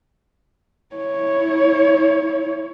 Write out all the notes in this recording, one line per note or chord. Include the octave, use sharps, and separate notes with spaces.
E4 C#5